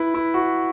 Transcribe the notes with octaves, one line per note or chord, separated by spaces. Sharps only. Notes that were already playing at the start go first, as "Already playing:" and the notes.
Already playing: E4 B4
E4
F#4